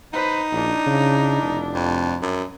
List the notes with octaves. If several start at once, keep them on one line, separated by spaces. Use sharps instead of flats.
D#4 B4 C5
A#1 D4 E4
C#3
F1
F2
F#2